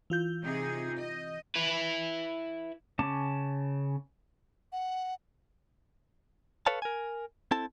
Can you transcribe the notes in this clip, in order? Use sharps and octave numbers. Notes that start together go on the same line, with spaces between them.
E3 F4 G6
C3 D#4 G#4
D#5
E4 B4
C#3 C#4 A5 D6
F#5
A4 B4 C#5 F5 A5
A#4 G#5
C4 E4 A4 A5